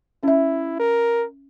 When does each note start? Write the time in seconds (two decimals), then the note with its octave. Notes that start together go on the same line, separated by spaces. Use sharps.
0.23 C#4 E4 E5
0.80 A#4